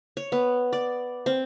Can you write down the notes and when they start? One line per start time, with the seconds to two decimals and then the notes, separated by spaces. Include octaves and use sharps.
0.17 C#5
0.32 B3
0.73 D5
1.26 C4